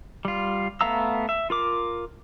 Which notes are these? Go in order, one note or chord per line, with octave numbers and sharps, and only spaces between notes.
G3 F4
A3 B3 F5 A#5 E6
E5
F4 A#4 D6